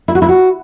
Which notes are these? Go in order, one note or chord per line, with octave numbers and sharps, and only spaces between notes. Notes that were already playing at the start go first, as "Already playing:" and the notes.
E4
F#4
E4
F#4